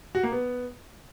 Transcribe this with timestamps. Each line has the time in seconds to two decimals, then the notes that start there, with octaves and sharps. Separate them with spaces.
0.15 F#4
0.23 A#3
0.32 B3